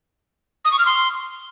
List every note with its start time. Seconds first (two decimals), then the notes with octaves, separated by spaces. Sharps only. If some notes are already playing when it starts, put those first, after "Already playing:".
0.65 D#6
0.72 C#6
0.79 F6
0.86 C6